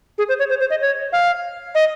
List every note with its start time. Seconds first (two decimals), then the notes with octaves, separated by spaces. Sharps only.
0.18 G#4
0.29 C5
0.39 C#5
0.49 C5
0.60 C5
0.70 D#5
0.81 C#5
1.13 F5
1.75 D#5